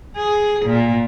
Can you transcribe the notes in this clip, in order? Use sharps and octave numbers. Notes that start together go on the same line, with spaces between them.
G#4
A#2